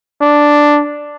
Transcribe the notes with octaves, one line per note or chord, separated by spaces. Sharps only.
D4